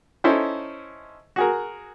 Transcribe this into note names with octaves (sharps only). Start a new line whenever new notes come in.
C#4 D#4 E4 A4 C5
F#4 G#4 A#4